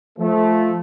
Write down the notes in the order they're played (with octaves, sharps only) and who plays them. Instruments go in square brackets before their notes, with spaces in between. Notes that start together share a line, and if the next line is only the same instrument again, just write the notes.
[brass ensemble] F3 A3